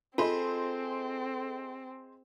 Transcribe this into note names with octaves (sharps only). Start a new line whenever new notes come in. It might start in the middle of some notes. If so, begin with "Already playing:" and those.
C4 F4 G#4 A4 C5 D#5